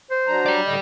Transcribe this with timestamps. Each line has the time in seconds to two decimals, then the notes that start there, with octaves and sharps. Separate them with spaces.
0.11 C5
0.27 F#3 D4 A#5
0.46 G4 D5
0.67 A2 D3 D#5